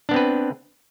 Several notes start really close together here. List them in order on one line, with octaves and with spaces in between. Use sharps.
D4 B3 C4 B4